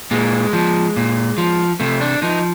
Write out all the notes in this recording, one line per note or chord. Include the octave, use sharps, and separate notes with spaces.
A#2 G#3
F3
A#2
F3
C3 A3
D4
F3 D#4